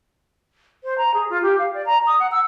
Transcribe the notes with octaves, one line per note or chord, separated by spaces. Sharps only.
C5
A#5
G#4
F4
G4
F5
D5
A#5
D#6
F#5
E6